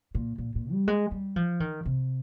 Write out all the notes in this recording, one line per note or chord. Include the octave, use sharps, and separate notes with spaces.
A#2
A#2
A#2
G3
G#3
G3
F3
D#3
C3